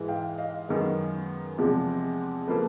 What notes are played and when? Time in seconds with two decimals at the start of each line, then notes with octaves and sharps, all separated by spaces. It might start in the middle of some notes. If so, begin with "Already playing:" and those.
Already playing: G#2 E3 G#3
0.08 F5 G5
0.38 D#5 F5
0.68 F#2 D#3 G#3 B3
1.58 E2 C3 F3 G#3
2.47 C#3 F3 A#3 A4 B4